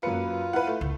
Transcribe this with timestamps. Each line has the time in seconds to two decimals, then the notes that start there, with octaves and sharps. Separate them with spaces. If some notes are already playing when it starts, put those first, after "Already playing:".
0.03 F#2 A#3 F4 B4 C#7
0.53 E4 B4 F5 F#5
0.67 A3
0.81 C#2